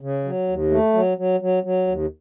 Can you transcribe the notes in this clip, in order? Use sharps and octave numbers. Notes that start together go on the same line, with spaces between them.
C#3
F#3
D#2
A3
F#3
F#3
F#3
F#3
D#2